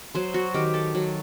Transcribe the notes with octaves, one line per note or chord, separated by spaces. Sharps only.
F#3 C5
F#4
D#3 G4
A4
F#3